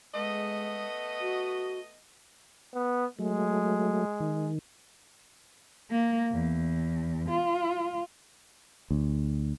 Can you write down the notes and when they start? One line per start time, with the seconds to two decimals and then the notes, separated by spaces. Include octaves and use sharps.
0.14 G#3 A3 B3 D#5
1.21 F#4
2.74 B3
3.19 F#3 G#3 A3
4.20 D#3
5.91 A#3
6.32 E2
7.29 F4
8.91 D2